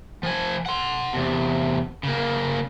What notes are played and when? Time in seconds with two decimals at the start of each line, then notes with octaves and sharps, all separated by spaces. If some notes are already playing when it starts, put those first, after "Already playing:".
0.23 F3 G#5
0.66 F#5 C6
1.13 E2 C3
2.03 C#3 A#3